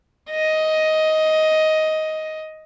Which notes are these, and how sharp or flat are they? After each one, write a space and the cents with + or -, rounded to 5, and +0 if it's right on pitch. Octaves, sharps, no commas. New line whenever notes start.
D#5 +10